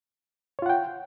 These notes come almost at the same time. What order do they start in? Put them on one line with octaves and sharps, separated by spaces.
C#5 F4 F#5 G5